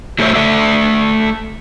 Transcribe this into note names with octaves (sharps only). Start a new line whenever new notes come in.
F#3 A3 F#4 C5 C#5 E5
A3 A4 D5 E5